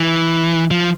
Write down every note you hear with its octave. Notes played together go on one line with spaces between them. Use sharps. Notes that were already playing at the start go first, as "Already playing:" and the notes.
Already playing: E3
F3